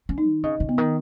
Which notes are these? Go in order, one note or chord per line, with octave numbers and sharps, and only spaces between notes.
C#4
D#4
D#3
C#3 D#5
C#3
B3
D#3